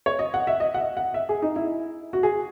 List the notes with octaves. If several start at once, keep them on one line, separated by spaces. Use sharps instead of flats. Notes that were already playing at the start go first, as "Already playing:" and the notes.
C#5
D#5
F#5
E5
D#5
F#5
E5
F#5
E5
G#4
D#4
E4
F#4
G#4